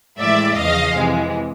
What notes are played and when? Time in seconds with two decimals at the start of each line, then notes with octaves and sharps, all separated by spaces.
0.19 A2 E3 G#3 D5 E5
0.57 E2 C#3 F3 D#5 F5
0.96 F2 C3 E3 G#3